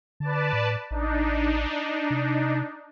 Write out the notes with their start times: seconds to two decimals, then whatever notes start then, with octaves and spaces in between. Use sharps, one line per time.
0.20 D3 B4 D5 A5
0.53 A2
0.91 A1 D4 D#4
2.10 C3